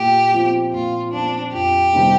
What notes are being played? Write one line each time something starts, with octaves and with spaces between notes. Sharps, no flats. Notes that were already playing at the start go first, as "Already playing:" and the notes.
Already playing: A#2 G4
F3 C4 F4
A#2 F4
F3 C4 D4 F4
F2 G4
C3 D#3 G3 C4